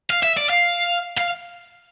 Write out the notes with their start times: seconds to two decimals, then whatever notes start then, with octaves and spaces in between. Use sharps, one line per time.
0.10 F5
0.23 E5
0.37 D5
0.49 F5
1.17 F5